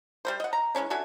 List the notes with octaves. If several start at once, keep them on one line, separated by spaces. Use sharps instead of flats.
G3 A#3 C5
D#5 F#5
A#5
E3 G#3 C#4 D4
D3 F#4 E5 G#5